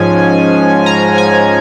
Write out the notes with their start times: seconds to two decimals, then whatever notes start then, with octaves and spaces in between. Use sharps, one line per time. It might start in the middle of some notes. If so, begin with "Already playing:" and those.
Already playing: G#2 F3 G#3 C#4 G#5
0.86 A#5
1.18 G#5